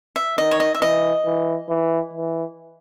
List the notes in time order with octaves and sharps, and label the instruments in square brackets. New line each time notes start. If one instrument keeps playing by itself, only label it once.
[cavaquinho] E5
[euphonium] D#3 [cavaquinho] D#5
[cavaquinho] C#5
D#5
E5
[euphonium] E3 [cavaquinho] D#5
[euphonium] E3
E3
E3